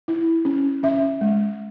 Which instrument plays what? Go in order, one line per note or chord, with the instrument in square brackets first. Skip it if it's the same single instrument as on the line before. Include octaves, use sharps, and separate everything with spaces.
[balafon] E4
C#4
C#4 E5
G#3